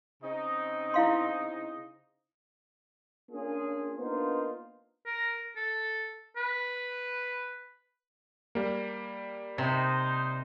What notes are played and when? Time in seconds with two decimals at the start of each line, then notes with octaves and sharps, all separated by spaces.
0.23 C#3 C4 D#4
0.94 E4 F5 C6
3.32 A#3 C#4 D4 F4 G#4
3.99 A#3 B3 D4 D#4 F4 C5
5.06 A#4
5.56 A4
6.37 B4
8.55 G3 A#3
9.58 C3 D#4 C5